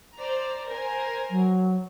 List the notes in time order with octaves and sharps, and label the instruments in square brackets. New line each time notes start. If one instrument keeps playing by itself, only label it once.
[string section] C5 D5 A#5
A#4 C5 G#5
[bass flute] F#3